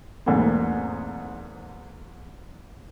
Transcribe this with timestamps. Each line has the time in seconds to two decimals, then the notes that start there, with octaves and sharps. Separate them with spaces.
0.26 B1 E2 G#2 A3 A#3 C4